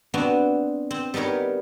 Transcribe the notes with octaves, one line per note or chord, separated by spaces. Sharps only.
B3 C4 D4 F#4
C4
G3 B3 D#4 A#4 C#5